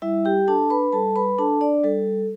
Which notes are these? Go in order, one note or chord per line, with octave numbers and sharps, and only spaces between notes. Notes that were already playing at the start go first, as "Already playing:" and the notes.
G3 E4 E5
G4 G5
D4 A4 A5
B4 B5
G3 A4 A5
B4 B5
D4 A4 A5
D4 D5
G3 A4